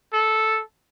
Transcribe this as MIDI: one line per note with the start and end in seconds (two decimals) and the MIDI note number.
0.13 0.61 69